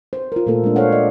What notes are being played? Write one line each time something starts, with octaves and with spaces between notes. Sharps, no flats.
C5
F4 A#4
A#2 A3 A#3 A4 A#4
G#3 D4
A4 C5 C#5 F5 F#5
D5 D#5